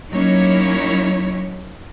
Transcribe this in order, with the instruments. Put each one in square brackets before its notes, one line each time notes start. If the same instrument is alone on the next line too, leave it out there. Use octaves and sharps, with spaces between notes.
[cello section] F#3 A#3 C#4 D#4 E4 C#5